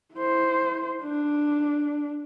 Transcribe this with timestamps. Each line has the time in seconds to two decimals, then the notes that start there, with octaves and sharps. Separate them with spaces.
0.15 E4 C5
1.03 D4